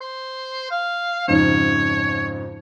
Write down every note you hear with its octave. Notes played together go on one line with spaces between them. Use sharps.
C5
F5
F2 G#2 C#3 C#5